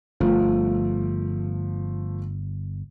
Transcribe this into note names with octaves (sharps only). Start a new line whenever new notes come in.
G1 F3 A3